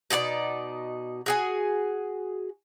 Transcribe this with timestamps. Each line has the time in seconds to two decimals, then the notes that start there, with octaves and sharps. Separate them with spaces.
0.10 B2 D#4 E4 D5
1.26 F#4 G#4 G#5